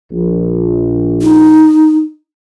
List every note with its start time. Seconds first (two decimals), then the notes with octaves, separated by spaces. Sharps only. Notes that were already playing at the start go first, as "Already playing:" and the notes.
0.11 A#1
1.22 D#4